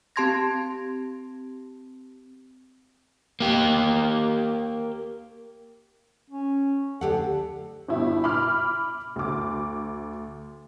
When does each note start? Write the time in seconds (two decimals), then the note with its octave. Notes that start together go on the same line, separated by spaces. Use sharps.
0.16 C4 G4 A5 C6 G#6 A#6
3.40 A#3 G4
6.30 C#4
7.01 D2 G4 A4 F#5
7.88 G1 B2 E4
8.24 B5 D6 F6
9.16 D2 D6